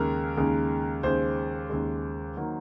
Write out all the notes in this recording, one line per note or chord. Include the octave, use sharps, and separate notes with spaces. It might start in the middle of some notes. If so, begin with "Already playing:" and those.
Already playing: D#2 C#3 G#3 A#4
D#2 C#3 G#3
D#2 C#3 G#3 C5
D#2 C#3 G#3
D#3 F#3 A#3